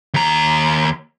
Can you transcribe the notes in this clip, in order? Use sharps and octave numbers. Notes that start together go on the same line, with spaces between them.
D#2 A#5